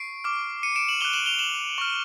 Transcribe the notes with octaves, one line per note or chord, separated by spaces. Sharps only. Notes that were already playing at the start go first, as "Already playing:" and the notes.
Already playing: C#6 C7 D7
D6 F6
C#7 D#7
D7 E7
E7 F#7
D6 F#6 F7 G7
E7 F#7
F7 G7
E7 F#7
C#6 F6